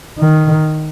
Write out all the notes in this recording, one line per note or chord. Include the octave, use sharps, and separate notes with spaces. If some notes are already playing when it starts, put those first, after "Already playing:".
D#3